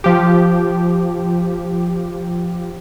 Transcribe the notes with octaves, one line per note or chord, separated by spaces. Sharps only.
F3 G4